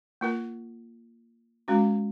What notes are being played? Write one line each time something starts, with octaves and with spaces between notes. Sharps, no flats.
A#3 F4 A#4
G#3 C#4 F#4